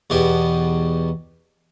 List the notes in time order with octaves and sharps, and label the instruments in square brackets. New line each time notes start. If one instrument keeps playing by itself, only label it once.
[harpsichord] E2 B2 G4